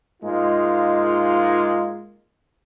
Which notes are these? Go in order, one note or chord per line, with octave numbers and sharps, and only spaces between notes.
G#2 G#3 A#3 D#4 F4